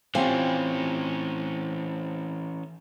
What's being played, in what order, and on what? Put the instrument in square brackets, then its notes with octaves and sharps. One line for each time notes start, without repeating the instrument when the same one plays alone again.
[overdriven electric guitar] E3 C#4 [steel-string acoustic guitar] C4 G#5 [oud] F4 G4 [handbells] C5